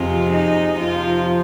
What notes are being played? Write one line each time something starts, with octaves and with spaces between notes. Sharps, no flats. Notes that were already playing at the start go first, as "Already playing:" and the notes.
Already playing: F2 C3 G#3 F4
D#4
F2 C3 F3 F4